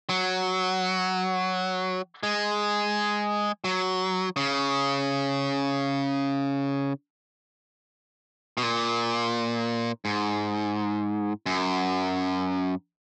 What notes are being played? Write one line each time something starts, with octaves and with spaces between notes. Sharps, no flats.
F#3
G#3
F#3
C#3
B2
A#2
G#2
F#2